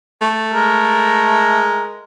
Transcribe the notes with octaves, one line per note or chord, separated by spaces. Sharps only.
A3
G#3 A#4